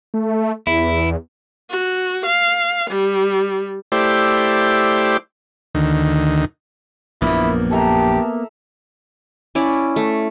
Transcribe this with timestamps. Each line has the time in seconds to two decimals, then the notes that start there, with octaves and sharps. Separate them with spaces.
0.14 A3
0.67 E2 E4
1.70 F#4
2.26 F5
2.90 G3
3.92 A3 E4 G4 C5 D5
5.75 D2 D#3
7.22 A#1 F#2 A#3 B3 E4
7.71 G4 A4 E5 A#5
9.55 C#4 E4 D5
9.96 A3